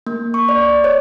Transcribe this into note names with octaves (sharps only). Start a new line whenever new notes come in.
A#3
C#6
D5
C#5